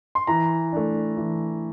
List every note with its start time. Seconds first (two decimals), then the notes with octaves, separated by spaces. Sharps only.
0.15 C6
0.27 E3 A#5
0.72 A3 D4
1.17 E3